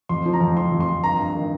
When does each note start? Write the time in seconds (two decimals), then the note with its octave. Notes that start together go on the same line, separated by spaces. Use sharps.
0.09 F2 C6
0.26 F3
0.34 A#5
0.41 F2
0.57 F3 C6
0.72 F2
0.80 C6
0.88 F2
1.03 G2 A#5
1.19 G2
1.35 D#3